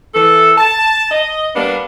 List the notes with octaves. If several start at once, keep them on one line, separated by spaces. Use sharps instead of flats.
E3 A4
A5
D#5
G3 A#3 B3 D4